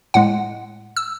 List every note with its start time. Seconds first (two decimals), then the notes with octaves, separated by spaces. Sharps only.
0.14 A2 G#3 F#5
0.97 E6